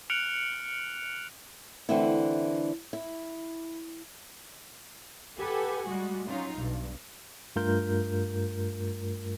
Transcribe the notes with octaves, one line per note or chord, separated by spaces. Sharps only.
F6 F#6 C#7 D7 F7 F#7
D3 E3 A3 C4 D4 E4
E4
G4 A4 B4 F#5 G#5
G3 G#3 F#4
F#3 C#4 D#4 F4
B1 G2
G2 A3 F4 A#4 G6